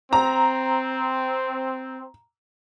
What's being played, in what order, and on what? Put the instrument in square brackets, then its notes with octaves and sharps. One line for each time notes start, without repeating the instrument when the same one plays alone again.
[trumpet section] C4 [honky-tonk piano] A#5